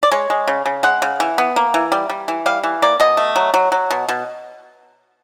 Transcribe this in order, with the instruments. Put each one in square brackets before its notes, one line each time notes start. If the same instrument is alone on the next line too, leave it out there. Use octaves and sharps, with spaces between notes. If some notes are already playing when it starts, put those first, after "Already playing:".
[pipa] D5
G#3 C#5
G#3
C#3
C#3
G#3 F#5
C#3
E3
B3
A#3
E3
G3
G3
E3
G3 F5
E3
A#3 D5
B2 D#5
A3
F#3
F#3
F#3
B2
B2